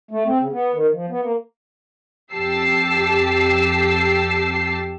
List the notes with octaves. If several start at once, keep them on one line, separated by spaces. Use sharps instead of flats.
A3
C4
C#3
B3
D#3
F3
B3
A#3
F2 G4 A5 E6 C7